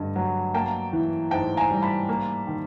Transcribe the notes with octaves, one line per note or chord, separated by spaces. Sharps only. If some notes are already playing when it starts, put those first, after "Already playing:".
Already playing: G2 D3 D#5
F#3
A#3 G5 A5
E3
G#2 G5 A5
G#5 A#5
G3
A5 B5
A#3
D#3